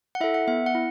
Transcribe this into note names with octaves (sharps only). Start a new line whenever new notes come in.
F#5
E4 A4 E5
F#5
B3 E5
F#5
E4